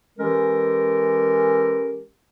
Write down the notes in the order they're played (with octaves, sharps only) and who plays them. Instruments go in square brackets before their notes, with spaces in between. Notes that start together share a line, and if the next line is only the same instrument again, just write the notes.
[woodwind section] E3 G#3 C#4 G4 A4 A#4